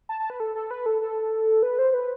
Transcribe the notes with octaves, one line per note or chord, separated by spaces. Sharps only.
A5
A5
B4
A4
A4
B4
A4
A4
B4
C5
B4